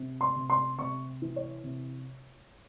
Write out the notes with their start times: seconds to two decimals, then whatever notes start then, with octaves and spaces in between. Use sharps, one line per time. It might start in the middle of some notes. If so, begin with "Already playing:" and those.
Already playing: C3
0.21 C6
0.36 C3
0.50 C6
0.79 C3 C#6
1.22 E3
1.36 C#5
1.64 C3